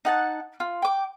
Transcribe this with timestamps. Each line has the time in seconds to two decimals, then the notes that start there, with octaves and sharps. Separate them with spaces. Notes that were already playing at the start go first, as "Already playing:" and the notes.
0.05 D#4 F#5 A5
0.60 F4
0.82 G5 D6